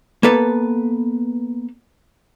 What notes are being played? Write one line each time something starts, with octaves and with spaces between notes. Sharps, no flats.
A#3 B3 A4 B4